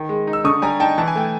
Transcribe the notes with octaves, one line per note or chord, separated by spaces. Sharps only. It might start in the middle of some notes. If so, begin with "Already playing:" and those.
Already playing: D#3
G#3
D#4
E6
D3 C#6 D#6
G3 G#5 A#5
D#4 G5 A5
E3 A5
G#5
A3 G5